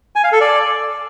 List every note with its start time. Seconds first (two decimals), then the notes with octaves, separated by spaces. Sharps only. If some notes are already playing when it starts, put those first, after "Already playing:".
0.15 G#5
0.24 F5
0.32 A4
0.41 D5